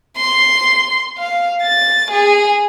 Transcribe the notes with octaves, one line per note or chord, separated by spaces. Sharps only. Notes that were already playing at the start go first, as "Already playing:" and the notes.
C6
F5
A6
G#4